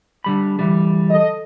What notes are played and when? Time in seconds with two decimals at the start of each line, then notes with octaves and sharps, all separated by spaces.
0.24 D3 G3 B5
0.59 D2 E3 G3
1.10 A4 D#5